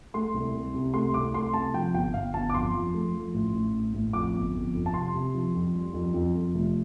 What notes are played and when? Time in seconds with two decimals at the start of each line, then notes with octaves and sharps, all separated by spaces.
0.14 A3 C6
0.34 C2
0.54 C2
0.74 C3
0.94 A3 C6
1.14 C2 D6
1.34 A3 C6
1.54 C3 A5
1.74 F3 G5
1.94 G1 G5
2.14 G1 F5
2.34 G1 A5
2.50 D6
2.54 F2 C6
2.74 F3
2.94 A3
3.14 F3
3.34 A1
3.54 A1
3.74 A1
3.94 A1
4.13 F2 D6
4.34 G1
4.54 F2
4.74 F2
4.86 A5
4.94 C3 C6
5.14 C3
5.34 F3
5.54 F2
5.74 G3
5.94 F2
6.14 F2
6.34 F2
6.54 F1